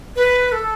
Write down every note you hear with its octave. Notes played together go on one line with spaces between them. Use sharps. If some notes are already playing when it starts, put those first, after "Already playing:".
B4
A4